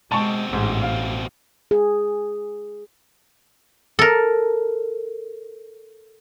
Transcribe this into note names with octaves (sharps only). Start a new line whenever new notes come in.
B2 G#3 C4 A5 C#6
A1 G#2
F5
G#4
A4 A#4